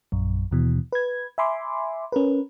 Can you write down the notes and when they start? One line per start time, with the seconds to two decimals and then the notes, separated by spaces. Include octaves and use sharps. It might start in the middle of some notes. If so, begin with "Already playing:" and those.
0.12 A#1 F#2
0.51 D#2 B2 E3
0.92 B4 G#6
1.38 E5 G#5 B5 C6 D6
2.12 C#4 A#4 B4